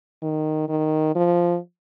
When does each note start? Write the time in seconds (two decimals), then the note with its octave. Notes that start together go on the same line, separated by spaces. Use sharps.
0.22 D#3
0.68 D#3
1.15 F3